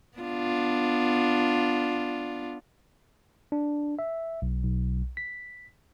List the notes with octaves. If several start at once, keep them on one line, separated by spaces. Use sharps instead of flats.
B3 D4 F4
D4
E5
B1
B1
B6